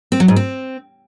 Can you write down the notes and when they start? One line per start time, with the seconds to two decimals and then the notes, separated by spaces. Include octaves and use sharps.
0.12 C4
0.20 F#3
0.28 G#2
0.36 C4